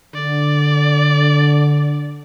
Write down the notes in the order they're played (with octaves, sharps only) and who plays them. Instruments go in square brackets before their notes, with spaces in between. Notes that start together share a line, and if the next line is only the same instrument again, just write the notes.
[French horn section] D3 [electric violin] D5